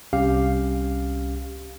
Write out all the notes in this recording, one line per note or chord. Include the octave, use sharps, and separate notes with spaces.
C2 C#4 G4 F5